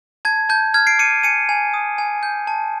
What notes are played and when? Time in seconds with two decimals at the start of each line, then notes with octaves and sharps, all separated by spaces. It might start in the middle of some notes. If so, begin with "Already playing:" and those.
0.25 A5 G#6
0.49 A5 G6
0.74 F6 G#6
0.87 C7 D7
0.99 D6 C#7 D#7
1.23 G#5 C#7 D#7
1.49 G#5
1.74 D#6
1.98 G#5
2.23 G6
2.47 A5